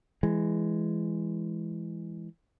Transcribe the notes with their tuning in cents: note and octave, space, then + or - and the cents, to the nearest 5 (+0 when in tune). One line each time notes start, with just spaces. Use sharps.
E3 +15 G#3 +0